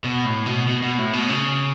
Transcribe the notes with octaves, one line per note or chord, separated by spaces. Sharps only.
B2
A2
B2
B2
B2
A2
B2
C#3